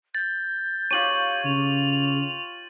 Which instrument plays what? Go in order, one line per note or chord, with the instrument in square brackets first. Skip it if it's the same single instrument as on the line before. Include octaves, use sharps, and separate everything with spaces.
[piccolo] G6 [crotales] A6
[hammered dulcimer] F4 G4 C#5 [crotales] D#7 F#7
[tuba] C#3 [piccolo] F7